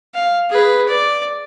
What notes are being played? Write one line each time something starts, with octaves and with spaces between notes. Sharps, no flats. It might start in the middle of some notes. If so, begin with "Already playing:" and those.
F5
G#4 B4
D5